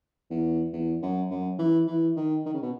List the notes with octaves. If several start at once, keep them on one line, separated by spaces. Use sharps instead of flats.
E2
E2
F#2
F#2
E3
E3
D#3
D#3
C#3
B2